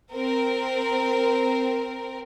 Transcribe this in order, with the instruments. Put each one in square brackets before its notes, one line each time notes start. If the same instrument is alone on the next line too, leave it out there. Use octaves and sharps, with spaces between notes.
[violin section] C4 A#4